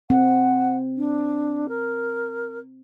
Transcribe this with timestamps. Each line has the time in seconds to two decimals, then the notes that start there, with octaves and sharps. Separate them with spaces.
0.10 C4 F#5
0.97 D4
1.68 A#4